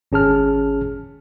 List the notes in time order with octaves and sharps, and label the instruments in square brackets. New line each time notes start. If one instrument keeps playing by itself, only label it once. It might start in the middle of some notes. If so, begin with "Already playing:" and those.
[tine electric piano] G#1 C#4 G#4 A5 F6